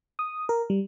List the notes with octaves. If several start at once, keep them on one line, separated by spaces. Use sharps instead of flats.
D#6
A#4
G3